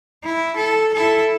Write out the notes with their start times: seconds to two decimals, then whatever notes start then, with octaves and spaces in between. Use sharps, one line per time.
0.24 E4
0.56 A4
0.94 E4 A4